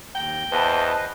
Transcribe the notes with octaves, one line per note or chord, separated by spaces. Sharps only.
D#2 G5 A#5
E2 B4 C5 D#5 A5